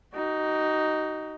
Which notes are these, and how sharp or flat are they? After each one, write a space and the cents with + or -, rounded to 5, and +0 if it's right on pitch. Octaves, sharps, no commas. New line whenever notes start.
D#4 +0 F#4 +40